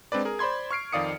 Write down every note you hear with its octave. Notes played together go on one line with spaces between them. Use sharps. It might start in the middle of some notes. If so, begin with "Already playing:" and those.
G#3 C4 D4 B4 D5
G#4 A#4
C5 D5 B5 C6 G#6
C#6 F6 C7 D7
F2 D#3 D5 F5 D#6 C#7